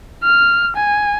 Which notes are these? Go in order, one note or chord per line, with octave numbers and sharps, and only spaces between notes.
F6
G#5